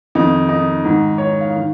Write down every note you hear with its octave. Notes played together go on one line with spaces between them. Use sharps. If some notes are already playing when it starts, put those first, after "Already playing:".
F2 D#3 D#4
D#4
G#2 D#3
C#5
F5
D#3